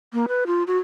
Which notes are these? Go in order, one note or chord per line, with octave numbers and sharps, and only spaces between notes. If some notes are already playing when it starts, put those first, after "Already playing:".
A#3
B4
F4
F#4